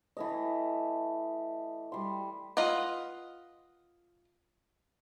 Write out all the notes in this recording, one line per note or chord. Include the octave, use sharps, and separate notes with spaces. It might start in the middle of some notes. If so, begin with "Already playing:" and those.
E3 A3 D#5
G3 C6
F4 B4 D#5 F#5